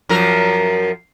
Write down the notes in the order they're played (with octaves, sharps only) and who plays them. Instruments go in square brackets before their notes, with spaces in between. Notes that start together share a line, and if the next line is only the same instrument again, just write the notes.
[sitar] F#2 F3 A#4